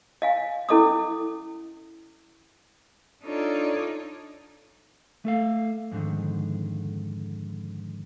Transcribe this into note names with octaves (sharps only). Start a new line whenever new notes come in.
D#5 F5 G#5
C#4 E4 A4 D#5 D6 D#6
D4 D#4 F4 A4 C#5 D5
A3 A4 F5
F2 G#2 B2 D3 D#3